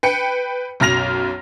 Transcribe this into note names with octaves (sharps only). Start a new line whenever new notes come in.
B4 G5 C#7
B1 F#2 F6 A#6 F7